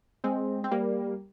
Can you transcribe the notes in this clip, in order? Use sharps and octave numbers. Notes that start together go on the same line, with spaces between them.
G#3 C4
C4
G3 A#3